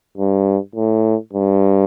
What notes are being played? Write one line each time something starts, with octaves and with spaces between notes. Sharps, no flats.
G2
A2
G2